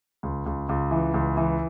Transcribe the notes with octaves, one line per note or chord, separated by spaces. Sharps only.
C#2
C#2
C#2
E3
C#2
E3